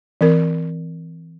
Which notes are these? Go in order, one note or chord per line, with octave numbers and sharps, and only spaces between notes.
E3 C4 A#4